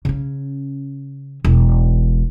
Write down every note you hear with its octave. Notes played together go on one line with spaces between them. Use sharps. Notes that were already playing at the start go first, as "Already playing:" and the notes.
C#3 C#4
E1